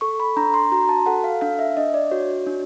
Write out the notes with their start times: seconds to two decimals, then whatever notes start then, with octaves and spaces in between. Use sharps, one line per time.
0.01 A4 C#6
0.20 B5
0.37 D4 A#5
0.54 C6
0.72 F#4 A#5
0.89 A5
1.06 A4 F#5
1.24 F5
1.41 D4 F5
1.59 E5
1.77 D4 D#5
1.94 D5
2.11 F#4 C#5
2.47 D4